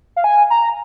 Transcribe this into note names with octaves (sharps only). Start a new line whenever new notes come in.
F5
G#5
A#5